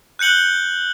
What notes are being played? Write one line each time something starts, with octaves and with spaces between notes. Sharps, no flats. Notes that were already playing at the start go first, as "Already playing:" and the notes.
F#6 G6 C#7 F#7 G7